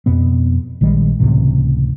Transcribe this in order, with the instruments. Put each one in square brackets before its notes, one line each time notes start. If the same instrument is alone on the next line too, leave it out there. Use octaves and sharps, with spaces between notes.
[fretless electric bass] F2 B2 B3
A#1 D#3 G3 G#3
C#2 A2 C3 E3